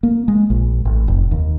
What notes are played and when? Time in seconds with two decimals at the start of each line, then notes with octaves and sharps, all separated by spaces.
0.03 A#3
0.28 G#3
0.50 A#1
0.85 A1
1.08 F1
1.31 D#2